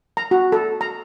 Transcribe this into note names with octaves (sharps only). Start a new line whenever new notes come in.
A#5
F#4
A4
A#5